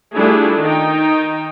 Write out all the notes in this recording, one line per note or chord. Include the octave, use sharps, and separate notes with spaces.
G3 A3 D4 E4 F4 G#4
D#3 D#4 G5